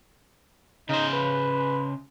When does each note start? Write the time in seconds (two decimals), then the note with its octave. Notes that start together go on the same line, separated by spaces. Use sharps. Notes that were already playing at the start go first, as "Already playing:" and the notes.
0.89 C#3 D#4 C5
1.13 B4